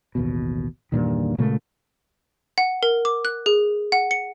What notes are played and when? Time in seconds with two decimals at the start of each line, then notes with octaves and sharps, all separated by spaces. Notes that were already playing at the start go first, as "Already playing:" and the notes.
0.15 A1 D#2 B2
0.92 E2 G2 A#2 D#3
1.38 A#2 C#3 G#3 A3
2.58 F#5
2.83 A#4
3.05 D6
3.25 F#6
3.46 G#4
3.92 F#5
4.11 C#7